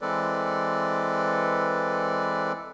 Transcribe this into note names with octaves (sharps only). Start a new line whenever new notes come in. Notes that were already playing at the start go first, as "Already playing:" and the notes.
E3 G#3 C4 A4 B4 D5